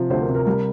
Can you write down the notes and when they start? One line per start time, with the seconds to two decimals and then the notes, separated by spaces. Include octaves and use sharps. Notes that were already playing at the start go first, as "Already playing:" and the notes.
Already playing: C3 F3
0.10 D2 C5
0.22 A#4
0.29 C3
0.35 A#4
0.47 G3 A#4